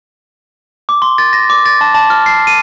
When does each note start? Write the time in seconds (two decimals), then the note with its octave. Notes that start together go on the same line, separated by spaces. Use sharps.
0.89 D6
1.02 C6
1.18 A6
1.33 A#6
1.50 D6
1.66 A6
1.81 A5
1.94 A5
2.10 F6
2.26 C7
2.47 D#7